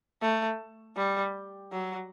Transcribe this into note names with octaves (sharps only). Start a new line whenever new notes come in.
A3
G3
F#3